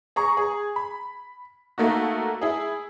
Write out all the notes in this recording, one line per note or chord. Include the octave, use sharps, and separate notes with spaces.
G#4 A#5 C#6
G#4
B5
A3 A#3 D#4 F#4
E4 G#4